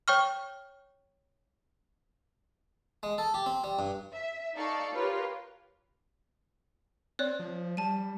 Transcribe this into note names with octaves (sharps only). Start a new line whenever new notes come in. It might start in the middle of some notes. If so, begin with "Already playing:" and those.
C#5 G5 C#6 F6
G#3
A4
G4
C4
G3
G2
E5
D#4 A4 D5 F5 C#6
F4 G4 A#4 B4 C#5
C4 C#5 D5 F#6
F3
G3 A5 D#7